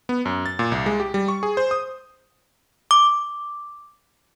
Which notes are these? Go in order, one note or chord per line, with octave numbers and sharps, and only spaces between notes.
B3
F#2
A6
A#2
C2
G#3
G4
G3
C#6
G#4
C5
D#6
D6